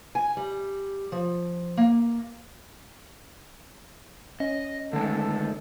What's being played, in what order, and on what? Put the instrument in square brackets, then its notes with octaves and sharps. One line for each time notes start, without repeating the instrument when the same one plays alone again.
[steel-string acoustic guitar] G#5
G3
F3
A#3
[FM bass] C#4 [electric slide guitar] D#5
[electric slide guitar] D3 G#3 [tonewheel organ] D#3 A3 [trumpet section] A4